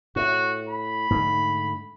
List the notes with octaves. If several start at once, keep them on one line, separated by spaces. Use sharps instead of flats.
A2 F#4
B5
G#2 D3 A3